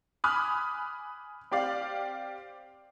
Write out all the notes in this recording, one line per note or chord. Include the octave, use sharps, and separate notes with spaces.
G#5 B5 D6 D#6 F6 F#6
C4 G4 D5 F5